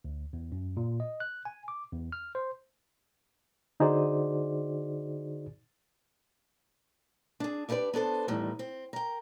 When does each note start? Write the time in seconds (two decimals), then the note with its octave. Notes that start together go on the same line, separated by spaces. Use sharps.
0.05 D2
0.33 E2
0.52 F#2
0.77 A#2
1.00 D#5
1.20 F#6
1.45 G#5
1.68 D6
1.92 E2
2.12 F6
2.35 C5
3.80 D3 D#4 F#4 G#4 C5 D5
7.40 D4 G#4
7.69 D4 E4 G4 B4 D5
7.93 B3 D4 A4 C5
8.28 E2 A2 D#3 G3
8.59 C4
8.93 A#4 G5